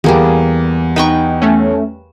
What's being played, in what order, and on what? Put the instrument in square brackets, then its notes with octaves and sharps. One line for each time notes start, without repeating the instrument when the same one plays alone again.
[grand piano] E2 [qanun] G3 A#3 G#4
[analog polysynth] D#4 [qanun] B4 G5 C#6
[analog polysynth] A3 C#4